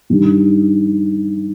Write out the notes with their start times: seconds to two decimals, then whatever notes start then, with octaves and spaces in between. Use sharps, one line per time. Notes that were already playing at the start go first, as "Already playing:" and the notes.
0.10 G2 D#3 G3